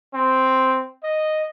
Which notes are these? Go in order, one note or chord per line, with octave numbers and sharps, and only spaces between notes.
C4
D#5